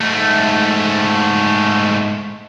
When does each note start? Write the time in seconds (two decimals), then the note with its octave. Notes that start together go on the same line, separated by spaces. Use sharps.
0.01 G#2 A3